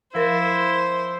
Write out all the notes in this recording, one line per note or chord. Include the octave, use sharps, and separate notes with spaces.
F3 E4 A#4 C5 A6